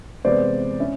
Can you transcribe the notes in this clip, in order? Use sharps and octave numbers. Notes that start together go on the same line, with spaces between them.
C3 E3 G#3 B3 C5 D5
C#4 E4